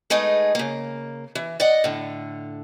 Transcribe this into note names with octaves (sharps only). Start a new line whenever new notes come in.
G#3 A3 D#4 G#4 B4
C#3 A#3
E3
D5 D#5 F#5
A2 D3